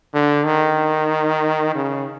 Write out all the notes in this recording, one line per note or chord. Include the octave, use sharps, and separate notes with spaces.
D3
D#3
C#3